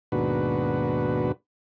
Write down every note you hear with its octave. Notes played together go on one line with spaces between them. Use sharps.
D#2 G#2 B2 D4 F#4 B4